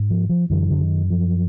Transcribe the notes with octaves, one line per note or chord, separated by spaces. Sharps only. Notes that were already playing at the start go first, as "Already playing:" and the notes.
Already playing: G#2
F3
F3
F#2 D3 E3
D3
D#3
F3